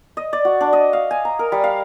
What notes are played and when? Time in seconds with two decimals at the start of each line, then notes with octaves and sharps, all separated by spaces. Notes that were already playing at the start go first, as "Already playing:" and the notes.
0.17 D#5
0.33 D5
0.45 F#4
0.61 D4
0.73 D#5
0.93 F5
1.11 G#5
1.25 A#5
1.39 A#4
1.52 G3
1.64 F5